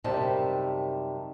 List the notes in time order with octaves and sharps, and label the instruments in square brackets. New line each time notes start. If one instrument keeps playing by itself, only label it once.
[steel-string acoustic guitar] F#2 C3 D#3 G3 A5